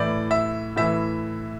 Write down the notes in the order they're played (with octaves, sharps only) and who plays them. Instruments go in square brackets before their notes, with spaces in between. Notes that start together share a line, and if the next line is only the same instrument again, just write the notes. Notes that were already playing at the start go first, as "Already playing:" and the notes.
Already playing: [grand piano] A2 E3 D5
E5
A2 E3 E5